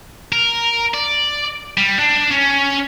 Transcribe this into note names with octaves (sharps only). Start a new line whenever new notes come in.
A#4
D5
G3
D4
C#4